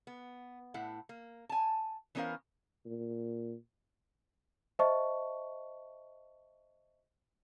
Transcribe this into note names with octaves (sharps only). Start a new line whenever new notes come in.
B3
A2 E4 F#5
A#3
G#5 A5
E3 B3 C#4 A#4 C5 F5
A#2
C5 D#5 E5 A5 C#6